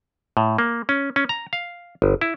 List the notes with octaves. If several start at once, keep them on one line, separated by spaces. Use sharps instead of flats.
A2
A#3
C#4
C#4
A#5
F5
G1
E4